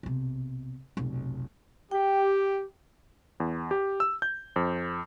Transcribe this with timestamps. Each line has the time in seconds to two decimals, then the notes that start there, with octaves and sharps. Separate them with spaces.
0.03 B1 C3
0.97 F1 B1
1.91 G4 G5
3.40 E2
3.71 G4
4.00 E6
4.22 G6
4.56 F2